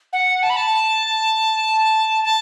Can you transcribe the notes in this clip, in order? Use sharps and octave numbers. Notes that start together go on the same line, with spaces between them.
F#5
A5
B5
A5
A5